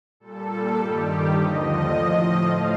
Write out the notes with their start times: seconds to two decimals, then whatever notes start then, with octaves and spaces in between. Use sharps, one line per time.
0.20 A#2 G3 A4
0.74 G2 D#3 G3 G4
1.30 D#2 D3 F3 D#5
1.85 A2 F3
2.39 A2 F3 F5